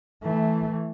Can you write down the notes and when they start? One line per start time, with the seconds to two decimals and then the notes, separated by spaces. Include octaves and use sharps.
0.23 E3 A3